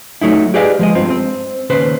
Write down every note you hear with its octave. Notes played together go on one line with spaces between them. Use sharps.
F#3 A3 D#4 E4
G4 G#4 B4 D5 D#5 F5
F3 G#3 D#5
G2 C4 F4
C4
D#2 C#3 B4 C5